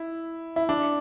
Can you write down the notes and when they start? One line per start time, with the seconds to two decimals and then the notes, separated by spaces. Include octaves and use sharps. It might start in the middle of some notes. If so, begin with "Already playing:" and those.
Already playing: E4
0.56 E4
0.69 D4